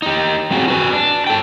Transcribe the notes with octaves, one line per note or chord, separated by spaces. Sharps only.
D#4 G4
F#3 C4 F4 F#4 G#4
F#4 B4 G#5
D4
A4 G5